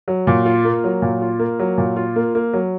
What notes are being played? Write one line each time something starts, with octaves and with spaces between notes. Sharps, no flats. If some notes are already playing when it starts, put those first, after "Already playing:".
F#3
A#2
F4
A#3
F#3
A#2
F4
A#3
F#3
A#2
F4
A#3
A#3
F#3